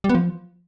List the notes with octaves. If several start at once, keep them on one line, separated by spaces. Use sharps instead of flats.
G3
B3
F3